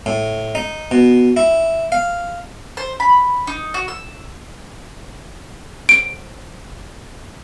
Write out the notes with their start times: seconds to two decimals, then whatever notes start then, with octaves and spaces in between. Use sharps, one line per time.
0.06 A2
0.55 D#4
0.91 B2
1.37 E4
1.92 F5
2.77 C5
3.00 B5
3.47 D#4
3.74 F#4
3.88 E6
5.89 D7